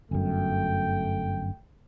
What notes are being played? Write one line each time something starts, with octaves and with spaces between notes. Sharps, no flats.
G1 F#2 A3 G5